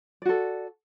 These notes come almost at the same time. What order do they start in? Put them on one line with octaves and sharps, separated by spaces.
D5 F#4 A4